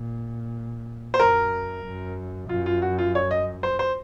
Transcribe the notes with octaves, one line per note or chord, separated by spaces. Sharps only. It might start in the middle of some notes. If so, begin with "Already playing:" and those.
Already playing: A#2
C5
F#2 A#4
F#2
F#2 F4
F4
F#4
F4
C#5
D#5
C5
C5